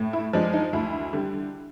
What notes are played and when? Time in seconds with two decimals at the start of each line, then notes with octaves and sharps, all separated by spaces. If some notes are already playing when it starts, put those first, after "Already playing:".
Already playing: A2
0.13 E4
0.33 F3 G#3 D4
0.53 D#4
0.73 D2 E4
1.13 D3 G3